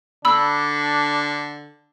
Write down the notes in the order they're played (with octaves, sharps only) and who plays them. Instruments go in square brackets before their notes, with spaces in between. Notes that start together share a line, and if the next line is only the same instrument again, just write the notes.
[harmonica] D3 [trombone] D4 [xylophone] B5 E6